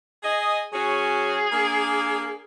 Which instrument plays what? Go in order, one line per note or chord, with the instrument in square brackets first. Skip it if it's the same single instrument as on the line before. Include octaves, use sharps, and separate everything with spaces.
[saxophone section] G#4 D#5
[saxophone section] F#3 C#4 F#4 [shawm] G#4
[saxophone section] A#3 D4